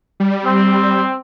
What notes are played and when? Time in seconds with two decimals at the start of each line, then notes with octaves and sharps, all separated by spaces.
0.20 G3
0.45 C4